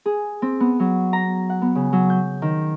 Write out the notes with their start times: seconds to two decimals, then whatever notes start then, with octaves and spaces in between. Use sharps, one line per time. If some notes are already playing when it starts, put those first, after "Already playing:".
0.06 G#4
0.42 C4
0.60 B3
0.80 F#3
1.13 A#5
1.50 F#5
1.62 B3
1.75 C#3
1.93 F#3
2.10 G6
2.42 D#3